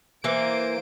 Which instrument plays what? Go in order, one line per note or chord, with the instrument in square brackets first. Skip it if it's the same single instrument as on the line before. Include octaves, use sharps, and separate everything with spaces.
[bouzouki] E3 A#3 [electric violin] C5 D7